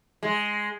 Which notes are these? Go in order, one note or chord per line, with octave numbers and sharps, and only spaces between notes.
G#3